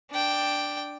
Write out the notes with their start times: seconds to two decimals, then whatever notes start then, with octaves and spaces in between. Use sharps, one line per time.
0.11 D4 G5